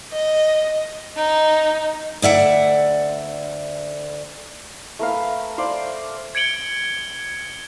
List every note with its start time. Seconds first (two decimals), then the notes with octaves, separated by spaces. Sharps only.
0.12 D#5
1.17 D#4
2.22 D2 D5 E5 F#5
4.99 A3 A#4 B4 F5
5.58 C5 D5 F5
6.35 G#6 C#7 D7 F#7 G7